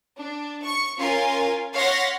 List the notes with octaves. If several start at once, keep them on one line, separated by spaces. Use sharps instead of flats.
D4
C#6 C#7
C#4 F4 A#4 G#5 C6
C#5 F5 F#5 C6 A#6 B6